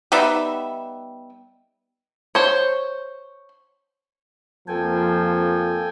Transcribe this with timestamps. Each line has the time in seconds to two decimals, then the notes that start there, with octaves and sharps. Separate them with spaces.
0.12 G3 B3 D#4 E5
2.35 C5 C#5
4.68 F2 F3 A#3 A4 G5 G#5